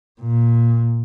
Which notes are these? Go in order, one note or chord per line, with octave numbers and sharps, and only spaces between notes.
A#2